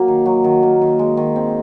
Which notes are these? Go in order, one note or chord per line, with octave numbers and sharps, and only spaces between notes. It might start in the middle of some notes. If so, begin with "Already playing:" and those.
Already playing: F#3 A#3
D#3
F#3
D#3
A#3
D#3
G#3
D#3
C4